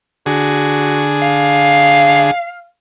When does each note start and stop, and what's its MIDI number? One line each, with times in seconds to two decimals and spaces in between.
0.26 2.31 50
0.26 1.04 66
0.26 2.31 68
1.22 2.68 77